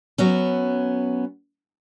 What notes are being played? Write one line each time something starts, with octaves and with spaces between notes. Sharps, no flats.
F#3 B3 C#4